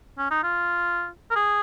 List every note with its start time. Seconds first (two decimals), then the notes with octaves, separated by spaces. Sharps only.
0.18 C#4
0.31 D#4
0.43 F4
1.31 A#4
1.35 G#4